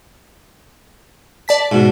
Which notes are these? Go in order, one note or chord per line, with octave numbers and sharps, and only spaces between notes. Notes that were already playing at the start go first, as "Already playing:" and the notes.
D5 A5 B6
G#2 B2